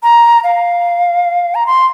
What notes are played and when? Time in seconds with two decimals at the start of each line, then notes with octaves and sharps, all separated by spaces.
0.03 A#5
0.44 F5
1.55 A#5
1.66 C6